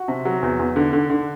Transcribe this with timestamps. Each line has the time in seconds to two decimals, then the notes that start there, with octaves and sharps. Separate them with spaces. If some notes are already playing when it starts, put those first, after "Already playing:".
Already playing: F#4
0.08 C3
0.25 F#3
0.43 E2
0.59 E2
0.76 D3
0.93 D3
1.10 D3